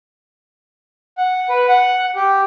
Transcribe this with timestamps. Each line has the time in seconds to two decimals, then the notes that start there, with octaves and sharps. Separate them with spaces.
1.18 F#5
1.49 B4
1.68 F#5
2.15 G4